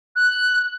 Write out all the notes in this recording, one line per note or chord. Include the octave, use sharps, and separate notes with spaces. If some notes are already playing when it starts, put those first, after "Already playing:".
F#6